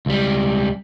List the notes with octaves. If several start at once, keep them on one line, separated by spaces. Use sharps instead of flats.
C#2 G3